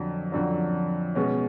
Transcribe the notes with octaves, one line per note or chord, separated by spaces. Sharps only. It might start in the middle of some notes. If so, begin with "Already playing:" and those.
Already playing: F2 D3 F#3
F2 D3 F#3
B2 G#3 C#4